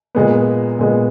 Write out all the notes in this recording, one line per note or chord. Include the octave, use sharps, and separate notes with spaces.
A#2 G#3 B3
A#2 G#3 B3